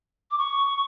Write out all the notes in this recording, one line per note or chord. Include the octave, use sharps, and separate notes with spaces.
D6
C#6